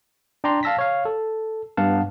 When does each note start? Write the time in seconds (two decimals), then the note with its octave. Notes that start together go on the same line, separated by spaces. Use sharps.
0.44 D4 D5 G5 A#5 C6
0.63 F5 A5 E6 A#6 B6
0.78 C#5 F5
1.05 A4
1.77 G2 B3 F5 F#5 A5